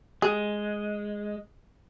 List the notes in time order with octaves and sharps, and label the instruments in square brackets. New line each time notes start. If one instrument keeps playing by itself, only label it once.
[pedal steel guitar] G#3 [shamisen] G#4